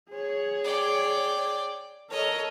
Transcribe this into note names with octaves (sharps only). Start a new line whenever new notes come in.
G#4 C#5
D5 G5
A4 A#4 C#5 D#5